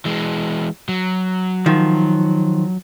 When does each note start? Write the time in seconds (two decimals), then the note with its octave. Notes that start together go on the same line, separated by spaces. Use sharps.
0.05 E3 G#3
0.89 F#3
1.66 D#3 F3